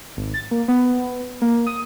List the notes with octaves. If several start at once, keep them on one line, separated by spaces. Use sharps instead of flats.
G#1
A6
A#3
B3
A#3
D#6